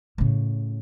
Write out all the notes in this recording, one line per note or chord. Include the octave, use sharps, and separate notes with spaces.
A2 C#3